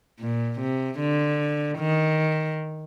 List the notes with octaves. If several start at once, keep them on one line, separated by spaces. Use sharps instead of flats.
A#2
C3
D3
D#3